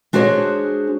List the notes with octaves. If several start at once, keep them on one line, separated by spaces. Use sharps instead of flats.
G#3 D4 F#4 G#4 C5 C#5